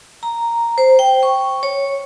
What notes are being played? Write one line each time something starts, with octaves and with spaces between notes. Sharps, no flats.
A#5
C5
G5
C#6
C#5